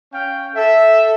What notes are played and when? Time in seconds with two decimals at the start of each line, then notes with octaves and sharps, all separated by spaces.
0.13 C#4 F5 G5
0.56 A4 E5